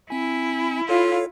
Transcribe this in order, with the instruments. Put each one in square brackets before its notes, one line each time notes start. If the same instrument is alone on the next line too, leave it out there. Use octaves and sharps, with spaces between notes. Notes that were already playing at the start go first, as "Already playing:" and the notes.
[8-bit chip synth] C4 G#5 [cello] E4
[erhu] F4 [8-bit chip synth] A4 C#5 F5